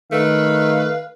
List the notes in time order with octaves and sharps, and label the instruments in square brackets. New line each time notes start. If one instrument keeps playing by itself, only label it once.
[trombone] D#3 [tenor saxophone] A3 [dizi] B4 [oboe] F5